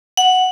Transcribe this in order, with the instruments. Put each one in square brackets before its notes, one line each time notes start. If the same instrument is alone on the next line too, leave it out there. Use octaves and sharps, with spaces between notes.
[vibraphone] F#5